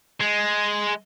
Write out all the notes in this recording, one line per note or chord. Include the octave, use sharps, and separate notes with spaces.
G#3